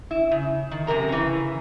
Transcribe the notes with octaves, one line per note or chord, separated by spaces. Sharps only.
E4
C#3
D#3
F#2 C3 A#4 A#5
C#3 E3